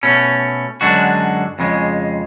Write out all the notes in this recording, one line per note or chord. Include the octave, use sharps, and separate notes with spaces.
B2 A3 C#4
F#2 D3 G#3 D4 F#4
F2 C#3 G#3